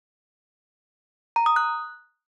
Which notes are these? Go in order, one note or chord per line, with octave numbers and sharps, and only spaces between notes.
A#5
D#6
F#6